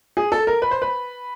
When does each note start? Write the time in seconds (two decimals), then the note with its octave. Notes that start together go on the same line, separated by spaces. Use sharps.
0.17 G#4
0.32 A4
0.47 A#4
0.62 B4
0.71 C5
0.82 B4